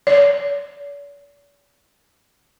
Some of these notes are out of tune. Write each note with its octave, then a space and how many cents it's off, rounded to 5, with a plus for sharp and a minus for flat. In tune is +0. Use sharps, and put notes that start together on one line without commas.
D5 -45